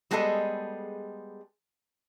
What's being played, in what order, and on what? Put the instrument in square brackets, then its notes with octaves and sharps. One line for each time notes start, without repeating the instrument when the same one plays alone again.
[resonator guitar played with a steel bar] G3 G#3 B3 G#4 A4 D#5